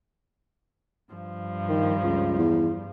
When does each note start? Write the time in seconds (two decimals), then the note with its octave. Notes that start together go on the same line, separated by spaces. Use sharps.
1.11 G2 F3
1.69 D#3
2.04 C#2
2.38 E2